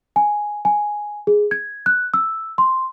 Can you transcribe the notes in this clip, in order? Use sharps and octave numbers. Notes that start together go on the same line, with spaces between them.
G#5
G#5
G#4
G#6
F#6
E6
C6